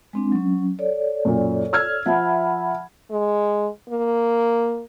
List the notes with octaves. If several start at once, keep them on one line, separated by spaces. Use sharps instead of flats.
G#3 C4 D4
F#3 C#4
A4 C#5 D5
F#2 A#2
E6 F6 G#6
F3 E5 F#5 A5 B5
G#3
A#3